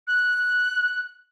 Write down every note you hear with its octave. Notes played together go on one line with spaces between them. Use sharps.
F#6